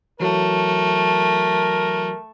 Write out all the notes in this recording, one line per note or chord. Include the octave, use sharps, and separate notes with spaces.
E3 F#3 A3 F#4 A#4